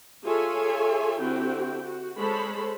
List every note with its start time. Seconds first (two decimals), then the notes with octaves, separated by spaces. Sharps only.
0.24 F4 G#4 A4 C#5 E5 G#5
1.20 D3 C4 E4 F#4 G4 G5
1.86 F#4
2.16 G#3 A4 C5 C#5 A5 B5